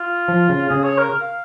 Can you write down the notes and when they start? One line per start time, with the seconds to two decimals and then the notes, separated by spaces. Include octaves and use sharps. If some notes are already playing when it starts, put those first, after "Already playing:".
Already playing: F4
0.28 F3
0.49 C#3
0.70 C#3 G#4
0.84 C#5
0.98 A#4
1.21 F5